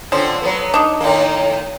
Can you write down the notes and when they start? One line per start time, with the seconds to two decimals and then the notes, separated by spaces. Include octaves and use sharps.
0.12 D3 F3 C4 C#4
0.42 F#3 B3
0.74 D4 D#4
1.01 A2 D#3 A#3